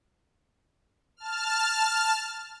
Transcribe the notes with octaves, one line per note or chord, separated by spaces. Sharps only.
A5 F6